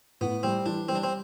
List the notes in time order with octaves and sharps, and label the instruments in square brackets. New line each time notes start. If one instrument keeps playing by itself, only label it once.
[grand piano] A2 [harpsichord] B3
[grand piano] G3 [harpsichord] C4
[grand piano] E3 [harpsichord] D4
[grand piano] G3 [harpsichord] C4
[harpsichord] D4
C4